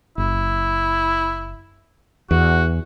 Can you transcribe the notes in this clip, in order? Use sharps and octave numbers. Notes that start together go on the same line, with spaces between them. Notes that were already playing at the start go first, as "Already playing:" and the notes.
F#1 E4
E2 F#4